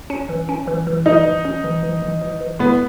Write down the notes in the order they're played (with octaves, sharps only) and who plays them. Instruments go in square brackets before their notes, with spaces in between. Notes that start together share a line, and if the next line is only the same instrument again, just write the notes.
[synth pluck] C#4
E3
C#4
E3
E3
[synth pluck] E3 [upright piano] D#4
[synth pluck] E3
C#4
E3
E3
E3
E3
E3
[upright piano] B3 [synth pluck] E4